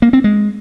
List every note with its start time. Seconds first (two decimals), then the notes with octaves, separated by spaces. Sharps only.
0.02 A#3
0.13 C4
0.24 G#3